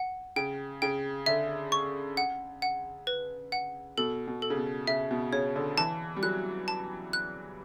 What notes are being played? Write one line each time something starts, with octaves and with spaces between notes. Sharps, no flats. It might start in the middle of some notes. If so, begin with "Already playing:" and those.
Already playing: F#5
C#3 G5
C#3 G5
D3 E5
C#6
F#5
F#5
B4
F#5
B2 A4
B2
A4
C#3
B2
C#3 E5
B2
C#3 C#5
D3
E3 A5
G3
F#3 F#6
A5
F#6